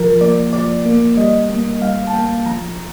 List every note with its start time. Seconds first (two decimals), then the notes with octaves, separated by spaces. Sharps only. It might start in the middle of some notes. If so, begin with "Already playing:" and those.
Already playing: F3 A#4
0.21 A#3 D5
0.53 F3 D5
0.86 A#3
1.17 G3 D#5
1.50 A#3
1.82 G3 F5
2.07 A5
2.14 A#3 G5
2.46 F3 A#5